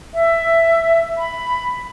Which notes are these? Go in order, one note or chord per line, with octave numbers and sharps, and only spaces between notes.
E5
B5